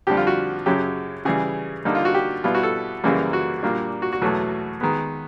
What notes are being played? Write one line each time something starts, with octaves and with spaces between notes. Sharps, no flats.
F2 D3 G3 G4
F4
F#4
F#2 C#3 F#3 G4
C#3 E3 G3 G#4
D3 G3 A#3 D#4
F4
F#4
G4
B2 G3 B3 E4 F4
F#4
A4
F#2 C#3 E3 G3 A#3
F#4
A#2 G3 A#3 D4
F#4
F#4
E2 B2 F#3 A3
D#3 G#3 B3